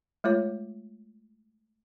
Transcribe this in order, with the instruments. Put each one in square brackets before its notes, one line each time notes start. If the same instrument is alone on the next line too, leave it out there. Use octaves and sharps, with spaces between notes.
[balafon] G#3 A3 F4 C#5